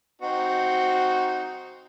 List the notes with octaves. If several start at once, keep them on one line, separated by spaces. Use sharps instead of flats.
C4 D#4 F#4